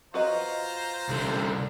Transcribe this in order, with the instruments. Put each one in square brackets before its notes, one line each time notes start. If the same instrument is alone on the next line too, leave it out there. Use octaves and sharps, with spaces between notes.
[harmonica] F4 C5 A#5 [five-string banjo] F#4 B4 D#5
[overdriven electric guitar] C2 D3